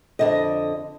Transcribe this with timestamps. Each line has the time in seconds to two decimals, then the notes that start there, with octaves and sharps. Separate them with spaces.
0.19 F2 D3 D#5